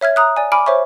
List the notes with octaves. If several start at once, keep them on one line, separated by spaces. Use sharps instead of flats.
C#5 E5 F6 G#6
A#5 D#6 F#6
D5 G#5
G#5 B5 D6 F6 D7
C5 C#5 E5 C#6